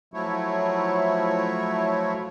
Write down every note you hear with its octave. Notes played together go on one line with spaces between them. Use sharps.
F3 F#3 A3 E4 C#5